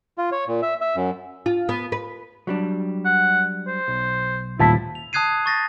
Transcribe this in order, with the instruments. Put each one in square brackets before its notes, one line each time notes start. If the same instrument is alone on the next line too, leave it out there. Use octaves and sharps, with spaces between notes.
[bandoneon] F4
C#5
A#2
E5
E5
F#2
[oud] F4
B3
B4
[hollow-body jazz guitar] F#3 G3 D4
[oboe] F#5
C5
[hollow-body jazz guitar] B1
[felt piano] D#1 A5 B6 [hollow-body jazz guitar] A2 F4 [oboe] E4
[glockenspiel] F7
A5 D#6 F#6 G#6 C7 D#7
C#6 A6 A#6